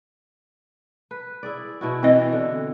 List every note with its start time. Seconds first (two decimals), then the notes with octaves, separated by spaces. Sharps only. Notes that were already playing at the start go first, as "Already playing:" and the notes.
1.11 B4
1.43 E4 G#4 D5
1.81 B2 E4 F#4
2.03 E3 C4 D#5
2.33 D3